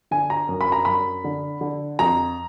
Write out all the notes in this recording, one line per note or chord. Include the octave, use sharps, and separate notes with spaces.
D3 G#5
A#5
F#2
B5
A#5
F#2 B5
D3
D3
F2 A#5